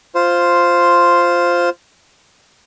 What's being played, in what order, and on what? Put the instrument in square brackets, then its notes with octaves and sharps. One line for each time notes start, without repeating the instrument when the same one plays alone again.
[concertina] F4 C5